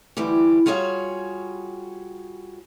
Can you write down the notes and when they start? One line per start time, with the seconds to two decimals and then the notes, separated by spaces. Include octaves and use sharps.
0.17 D2 E3 G3 G4
0.66 G3 F4 F#4 G#4 C#5 F5